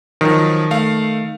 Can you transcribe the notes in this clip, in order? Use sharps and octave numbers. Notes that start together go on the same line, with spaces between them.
D#3 F3 F#3
A3 F5